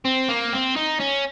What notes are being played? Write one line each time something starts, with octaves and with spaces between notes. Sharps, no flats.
C4
A#3
C4
D#4
C#4